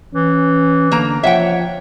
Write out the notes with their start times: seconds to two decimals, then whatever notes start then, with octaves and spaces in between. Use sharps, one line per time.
0.14 E3 C#4
0.92 D3 A#3 A#5
1.23 F3 C#5 E5 F#5 G5